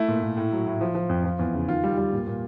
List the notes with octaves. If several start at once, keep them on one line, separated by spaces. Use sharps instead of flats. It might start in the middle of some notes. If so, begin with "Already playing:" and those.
Already playing: A3 E4
A#2
A#2
A2
F#3
A2
F3
F3
F2
F3
E2
C#3
D#3 F4
G3
G3
A#2
A#2